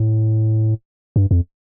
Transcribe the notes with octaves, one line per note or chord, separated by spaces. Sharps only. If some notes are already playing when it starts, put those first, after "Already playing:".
Already playing: A2
G2
F2